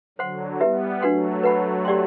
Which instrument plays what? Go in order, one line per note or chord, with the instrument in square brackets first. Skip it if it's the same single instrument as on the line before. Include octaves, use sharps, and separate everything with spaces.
[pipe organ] D3 F#3 [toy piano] C5 F#5 C6
[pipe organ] G3 B3 [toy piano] E4 G4 B4 E5
[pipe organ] F#3 A3 [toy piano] D4 F#4 B4 F#5 C6
[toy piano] B4 F#5 B5
G4 D5 G5 C6